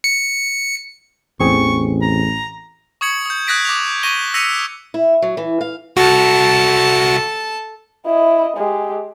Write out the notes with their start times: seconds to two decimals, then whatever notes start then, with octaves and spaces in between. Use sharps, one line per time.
0.04 C#7
1.40 A1 E2 C4 G#4 C#6
2.02 A#5
3.01 C#6 D#6 G#6 C#7 F#7
3.26 D#6 G6
3.47 D#6 F#6 G#6 A#6 B6 D7
3.65 D6 A#6 F7
4.03 C#6 A#6 D#7 G7
4.34 E6 A#6 B6 C#7 D#7 F7
4.94 E4
5.22 F#3
5.37 E3
5.61 F5
5.97 C2 F#4 A4 A5
8.06 E4 D#5
8.57 G#3 G4